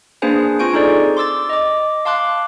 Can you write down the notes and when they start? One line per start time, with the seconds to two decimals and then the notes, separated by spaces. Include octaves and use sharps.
0.22 A#3 D4 G#4 B4 C5 G#5
0.59 C4 F4 G#5 C#6 G6 D7
0.74 D#4 G#4 A4 C5 D5
1.17 C6 D6 E6 A6
1.50 D#5 D6
2.05 F5 A5 C6 D6 F#6